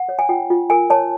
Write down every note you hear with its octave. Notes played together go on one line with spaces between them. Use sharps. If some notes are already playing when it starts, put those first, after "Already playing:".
Already playing: F#5
C#5
G#5
F4 G5
F4
A#4 G#5
C#5 A5